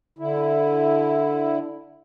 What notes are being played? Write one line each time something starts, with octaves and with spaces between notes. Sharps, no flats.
D3 E4